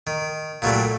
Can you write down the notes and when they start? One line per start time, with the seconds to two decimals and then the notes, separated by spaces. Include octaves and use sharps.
0.07 D#3
0.62 A#2 F#3 G3 A3